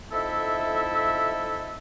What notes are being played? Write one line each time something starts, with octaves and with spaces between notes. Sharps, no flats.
F2 D#4 E4 A4 E5